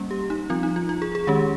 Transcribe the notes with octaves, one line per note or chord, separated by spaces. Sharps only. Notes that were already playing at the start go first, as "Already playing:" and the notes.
Already playing: G3 A#3 C#4
G4
D#4
F3 C4 F4
D#4
F4
F4
G#4
G#4
D#3 G#3 C#4 G4